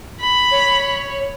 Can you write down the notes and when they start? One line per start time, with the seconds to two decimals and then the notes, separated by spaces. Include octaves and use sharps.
0.20 B5
0.51 C#5